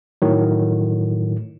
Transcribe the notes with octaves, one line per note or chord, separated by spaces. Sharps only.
A2 D#3 F#3